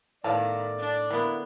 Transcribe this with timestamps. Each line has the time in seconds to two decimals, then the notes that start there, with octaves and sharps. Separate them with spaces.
0.24 A2 D#3 B3 D5 F5 A5
0.79 D4
1.11 D3 A#3 B3 E4